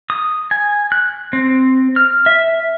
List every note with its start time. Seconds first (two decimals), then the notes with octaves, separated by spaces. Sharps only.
0.10 D#6
0.51 G#5
0.92 F#6
1.33 C4
1.96 F6
2.26 E5